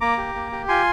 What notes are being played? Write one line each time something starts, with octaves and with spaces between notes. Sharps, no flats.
A#3 A#5 D6
G4
A#3
G4
F4 G#5 C6